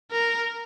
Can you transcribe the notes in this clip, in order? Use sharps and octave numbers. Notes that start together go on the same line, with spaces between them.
A#4